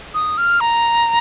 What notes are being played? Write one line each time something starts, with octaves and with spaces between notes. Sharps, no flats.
D#6
F6
A#5